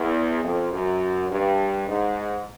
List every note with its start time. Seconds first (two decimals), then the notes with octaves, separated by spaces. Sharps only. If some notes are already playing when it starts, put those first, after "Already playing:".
Already playing: E2
0.43 F2
0.72 F#2
1.30 G2
1.88 G#2